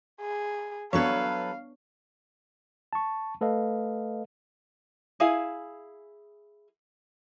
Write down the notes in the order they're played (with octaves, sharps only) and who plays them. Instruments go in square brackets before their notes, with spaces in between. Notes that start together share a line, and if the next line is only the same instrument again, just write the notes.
[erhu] G#4
[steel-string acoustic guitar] F#3 A4 B4 [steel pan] B3 D4 C#5 [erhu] F5
[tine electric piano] A5 C#6
A3 A4 B4 D#5 F5
[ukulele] E4 G#4 F5 G#5